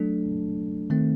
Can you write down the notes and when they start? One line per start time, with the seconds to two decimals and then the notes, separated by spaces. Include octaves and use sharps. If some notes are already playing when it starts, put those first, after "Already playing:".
Already playing: F#3 A3 D4 A4
0.90 D#3 A3 C4